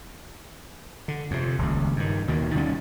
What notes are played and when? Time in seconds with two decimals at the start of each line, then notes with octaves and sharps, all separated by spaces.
1.08 D3
1.31 F2 C3
1.58 D#1 C#2
1.96 G2 D#3
2.28 D#2 B2 D#3
2.55 D2 D#3 G3 C#4